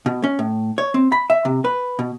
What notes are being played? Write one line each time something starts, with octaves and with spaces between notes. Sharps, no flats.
B2
C#4
A2
C#5
C4
B5
E5
C3
B4
B2